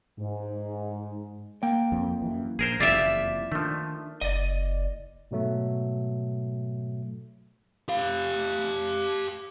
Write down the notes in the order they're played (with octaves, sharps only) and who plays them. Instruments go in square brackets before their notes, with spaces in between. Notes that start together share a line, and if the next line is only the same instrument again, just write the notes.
[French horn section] G#2
[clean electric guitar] A#3 G5
[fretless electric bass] F2
F#2 E3
[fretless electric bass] A#1 [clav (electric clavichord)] G#4 A#4 C5
[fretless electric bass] F#1 F2 E3 [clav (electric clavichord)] E4 F4 G4 [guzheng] D5 E5
[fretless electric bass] D#3 D4 [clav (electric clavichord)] F3 A3
[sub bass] F#1 [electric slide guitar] D5 D#5
[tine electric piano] G#2 B2 F#3 A3
[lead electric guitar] G4 F5